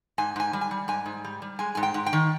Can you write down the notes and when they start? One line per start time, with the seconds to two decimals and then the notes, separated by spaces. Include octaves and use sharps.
0.18 G#2 G#5
0.36 G#2 G#5
0.53 G3
0.61 G#5
0.71 G3
0.88 G#2 G#5
1.06 G#2
1.25 G3
1.42 G3
1.59 G#3 G#5
1.75 G#2 G#5
1.83 G5
1.94 G#2
2.06 G5
2.13 D#3